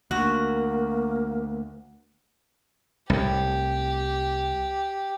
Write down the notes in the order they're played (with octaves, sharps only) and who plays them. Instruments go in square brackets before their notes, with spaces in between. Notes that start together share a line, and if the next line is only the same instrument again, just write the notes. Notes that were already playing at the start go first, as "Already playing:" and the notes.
[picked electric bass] D2 [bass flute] A#3 [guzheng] F#4
[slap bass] C2 A2 [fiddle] G4